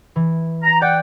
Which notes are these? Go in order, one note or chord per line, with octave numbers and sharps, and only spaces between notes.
E3
A#5
D5 F#5 G5